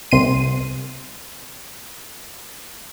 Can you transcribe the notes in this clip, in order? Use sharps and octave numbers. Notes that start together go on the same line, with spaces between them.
C2 C3 C6 D#7